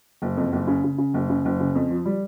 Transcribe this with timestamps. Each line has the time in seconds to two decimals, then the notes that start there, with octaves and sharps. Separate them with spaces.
0.22 F#1
0.37 F2
0.52 F#1
0.67 C#3
0.84 C#3
0.98 C#3
1.14 F#1
1.29 C#3
1.45 F#1
1.60 C#3
1.75 F2
1.90 F3
2.05 G3